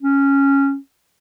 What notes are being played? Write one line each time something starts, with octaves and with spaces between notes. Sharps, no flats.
C#4